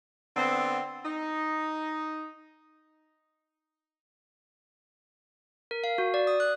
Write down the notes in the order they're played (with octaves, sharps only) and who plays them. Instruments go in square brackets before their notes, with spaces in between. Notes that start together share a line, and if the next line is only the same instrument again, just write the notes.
[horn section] D3 B3 C4
D#4
[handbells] A#4
F5
F#4
D5
D#6
F#6